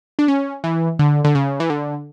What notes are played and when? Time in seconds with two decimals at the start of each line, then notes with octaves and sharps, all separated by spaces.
0.19 D4
0.28 C#4
0.64 E3
0.99 D3
1.24 D3
1.35 C#3
1.60 E3
1.70 D3